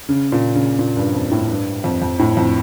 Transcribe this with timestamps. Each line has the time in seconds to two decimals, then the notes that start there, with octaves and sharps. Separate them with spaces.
0.09 C#3
0.32 A#2
0.55 C#3
0.79 A#2
0.97 G2
1.13 F2
1.31 A2
1.50 G2
1.84 F2
2.02 F2
2.19 A2
2.37 F2